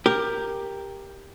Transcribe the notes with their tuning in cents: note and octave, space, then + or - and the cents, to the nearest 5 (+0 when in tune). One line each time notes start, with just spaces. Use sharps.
G4 +10 A#4 +0